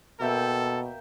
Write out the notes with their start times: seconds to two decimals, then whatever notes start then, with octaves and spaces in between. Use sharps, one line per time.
0.21 B2 A#3 A4 E5 G5